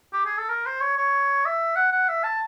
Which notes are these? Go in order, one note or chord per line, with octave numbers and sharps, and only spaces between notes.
G4
G#4
A4
A#4
C5
C#5
C#5
E5
F#5
F#5
E5
A5